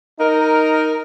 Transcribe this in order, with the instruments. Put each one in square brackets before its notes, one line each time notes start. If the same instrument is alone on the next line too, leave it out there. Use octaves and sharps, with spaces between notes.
[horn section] D#4 A#4